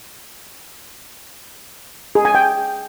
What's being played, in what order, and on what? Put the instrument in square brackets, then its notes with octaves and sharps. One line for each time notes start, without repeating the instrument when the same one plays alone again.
[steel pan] G#4
G#5
G5